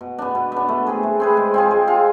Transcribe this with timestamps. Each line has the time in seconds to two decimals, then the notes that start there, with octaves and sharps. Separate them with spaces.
0.01 B2
0.18 B3 D4
0.35 B2
0.52 B3 D4
0.69 A3
0.87 C4 G#4 B4
1.03 A3
1.20 C4 G#4 B4
1.37 G#3
1.54 C4 F4 G#4
1.71 G#3
1.87 C4 F4 G#4